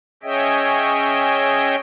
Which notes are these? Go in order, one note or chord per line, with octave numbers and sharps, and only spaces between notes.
C#4 G#4 C#5 D#5 E5 G5